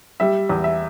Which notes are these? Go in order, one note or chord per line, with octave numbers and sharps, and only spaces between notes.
G3 E5
E2
E5